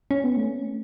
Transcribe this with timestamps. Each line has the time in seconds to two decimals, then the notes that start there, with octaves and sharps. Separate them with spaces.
0.11 C#4
0.24 B3
0.37 A3